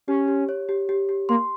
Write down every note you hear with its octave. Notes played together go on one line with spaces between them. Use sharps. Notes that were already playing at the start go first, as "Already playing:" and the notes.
C#4 G4
G4
C#5
G4
G4
G4
A#3 C6